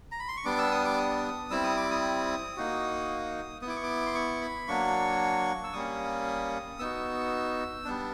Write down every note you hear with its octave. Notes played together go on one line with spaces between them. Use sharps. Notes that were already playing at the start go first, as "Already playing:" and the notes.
A#5
B5
C6
C#6
G3 B3 D4 D6
E6
D#6
D6
D#6
G3 C4 E4 E6
D#6
D6
D#6
A#3 D#4 F#4
B3 E4 D6 D#6
C#6
D6
C6
C#6
B5
F#3 A#3 D4 C#6
E6
G3 A#3 C#4 D#6
B3 D#4 F#4 E6
G3 B3 D4